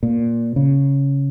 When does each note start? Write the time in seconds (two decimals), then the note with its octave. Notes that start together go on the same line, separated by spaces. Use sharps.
0.03 A#2
0.56 C#3